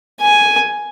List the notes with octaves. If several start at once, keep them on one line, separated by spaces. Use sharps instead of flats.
G#5